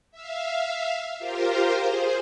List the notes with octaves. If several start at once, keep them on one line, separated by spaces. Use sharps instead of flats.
E5 F5
F4 G4 A#4 C5 F5
G#4 C5